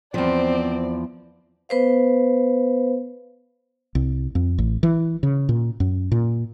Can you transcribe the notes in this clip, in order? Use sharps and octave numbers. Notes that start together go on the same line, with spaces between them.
E2 F3 C4 D5
B3 B4 C5 F5
C2
F2
A1
E3
C#3
A#2
F#2
A#2